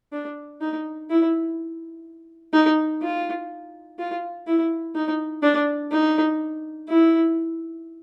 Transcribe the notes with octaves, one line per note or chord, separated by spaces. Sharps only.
D4
D#4
E4
D#4
F4
F4
E4
D#4
D4
D#4
E4